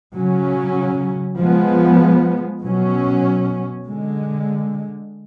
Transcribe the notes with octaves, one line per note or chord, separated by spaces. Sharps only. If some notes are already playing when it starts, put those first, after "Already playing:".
C#3 F#3 C#4
F3 G#3 B3
B2 F#3 C#4
D3 G#3